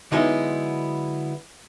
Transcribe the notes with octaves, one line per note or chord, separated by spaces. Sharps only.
D3 F#3 G#3 B3 D#4 E4